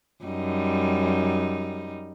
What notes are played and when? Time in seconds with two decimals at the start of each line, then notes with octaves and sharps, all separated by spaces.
0.24 F#2 G3 D#4